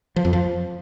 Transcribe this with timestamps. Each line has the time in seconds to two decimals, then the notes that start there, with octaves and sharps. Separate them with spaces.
0.16 F3
0.25 F2
0.33 F3